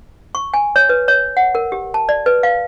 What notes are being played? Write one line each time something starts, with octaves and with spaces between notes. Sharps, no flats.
C#6
G#5
C#5
B4
C#5
F#5
A#4
G4
A5
D5
B4
F5